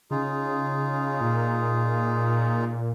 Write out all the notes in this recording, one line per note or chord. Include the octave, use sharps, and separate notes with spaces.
C#3 D#4 F4 G#4
A#2